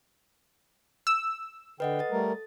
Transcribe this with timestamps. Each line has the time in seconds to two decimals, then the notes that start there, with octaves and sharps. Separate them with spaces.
1.07 E6
1.80 D3 B4 D#5 F#5 G5
1.99 A4 A6
2.12 G3 A3 A#4